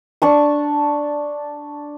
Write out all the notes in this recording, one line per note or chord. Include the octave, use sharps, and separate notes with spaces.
D4 A5 C#6